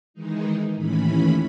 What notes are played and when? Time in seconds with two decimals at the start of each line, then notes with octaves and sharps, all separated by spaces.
0.14 D#3 E3 G#3 D#4
0.74 D#2 A2 E3 C#4 B5